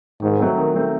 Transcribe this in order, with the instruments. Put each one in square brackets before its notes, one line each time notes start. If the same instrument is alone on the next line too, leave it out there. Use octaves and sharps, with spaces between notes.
[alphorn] G#2 [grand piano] D#3
[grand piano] F#3 A3 C4
D#3
F#3 A3 C4